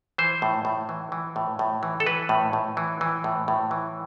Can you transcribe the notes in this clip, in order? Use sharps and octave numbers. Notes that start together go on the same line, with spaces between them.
E3 C5
A2
A2
E3
E3
A2
A2
E3
A4
E3 B4
A2
A2
E3
E3
A2
A2
E3